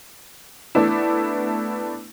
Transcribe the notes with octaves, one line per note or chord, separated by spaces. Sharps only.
A3 B3 D4 E4